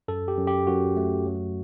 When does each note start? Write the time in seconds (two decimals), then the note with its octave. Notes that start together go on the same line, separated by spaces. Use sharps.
0.08 F#2 A4
0.28 G4
0.38 F#2
0.47 G4
0.67 F#2 F#4
0.97 A3
1.26 F#3